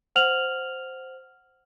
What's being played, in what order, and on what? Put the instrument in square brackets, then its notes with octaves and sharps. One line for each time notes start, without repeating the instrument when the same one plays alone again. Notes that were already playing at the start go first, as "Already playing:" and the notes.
[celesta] C5 F#5 F6 F7 F#7